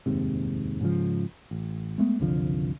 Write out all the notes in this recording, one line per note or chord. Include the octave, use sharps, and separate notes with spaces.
F1 D#2 G#2 C3
G#2 C#3 F3
A1
G#3 A3 B3
F#1 C2 D3 F3